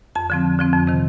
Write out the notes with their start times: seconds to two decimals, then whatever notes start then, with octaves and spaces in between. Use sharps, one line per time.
0.15 F2 A5
0.30 D3 F3 C4
0.44 F2
0.59 D3 F3 C4
0.73 F2
0.87 C3 D#3